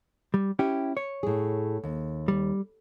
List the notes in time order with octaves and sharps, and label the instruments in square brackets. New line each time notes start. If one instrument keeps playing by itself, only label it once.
[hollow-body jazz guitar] G3
C#4 E4 G4
C#5
[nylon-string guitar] A2 G#4
D#2
[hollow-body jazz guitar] G3